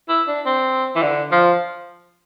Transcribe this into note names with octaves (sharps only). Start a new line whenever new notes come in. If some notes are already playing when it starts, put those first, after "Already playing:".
E4
D4
C4
E3
D3
F3